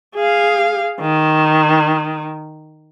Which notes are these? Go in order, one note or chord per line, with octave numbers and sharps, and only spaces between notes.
G#4 F5
D#3